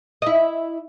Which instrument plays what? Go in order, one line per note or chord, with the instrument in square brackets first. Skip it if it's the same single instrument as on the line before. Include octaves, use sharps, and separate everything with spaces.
[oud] E4 D#5